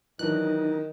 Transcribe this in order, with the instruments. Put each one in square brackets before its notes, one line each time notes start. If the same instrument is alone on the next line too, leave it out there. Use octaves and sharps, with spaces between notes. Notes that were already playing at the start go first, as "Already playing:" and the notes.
[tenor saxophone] D#3 [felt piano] E3 F#3 D4 [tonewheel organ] D#4 [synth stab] F#6